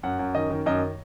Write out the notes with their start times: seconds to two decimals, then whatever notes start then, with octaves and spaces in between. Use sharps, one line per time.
0.03 F#2 F#5
0.19 F#2
0.35 D#3 D#5
0.50 D#3
0.66 F#2 D#5